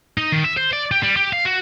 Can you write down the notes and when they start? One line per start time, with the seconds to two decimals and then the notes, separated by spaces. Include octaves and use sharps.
0.18 D#4
0.32 D#3
0.44 E5
0.57 C5
0.73 D5
0.92 G4
1.03 G3
1.17 G4
1.33 F5
1.45 F#4